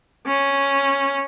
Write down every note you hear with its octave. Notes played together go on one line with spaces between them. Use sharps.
C#4